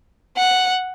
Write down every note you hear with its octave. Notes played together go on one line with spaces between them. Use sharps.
F#5